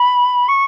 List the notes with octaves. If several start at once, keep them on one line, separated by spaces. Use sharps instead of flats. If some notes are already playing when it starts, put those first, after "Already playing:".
Already playing: B5
C#6